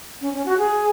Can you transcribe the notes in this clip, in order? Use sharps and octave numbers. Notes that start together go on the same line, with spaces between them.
C#4
C#4
F#4
G#4